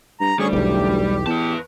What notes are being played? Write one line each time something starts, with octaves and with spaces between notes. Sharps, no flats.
G2 A#5
D2 G3 C#4 G#4 C#6
B1 E2 G4
E2 B4 A5